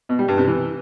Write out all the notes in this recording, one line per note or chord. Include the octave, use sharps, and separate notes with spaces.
B2
G3
G2
C3
E3